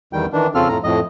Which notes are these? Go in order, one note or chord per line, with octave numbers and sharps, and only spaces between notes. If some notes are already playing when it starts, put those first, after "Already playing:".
E2 D#3 G3 G5
D#3 E3 D4
F2 C#3 C4 F4 A4 F6
F2 A2 A#5
F2 A2 D#5